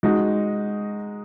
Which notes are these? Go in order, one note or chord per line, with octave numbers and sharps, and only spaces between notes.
G#3 D#4 F#4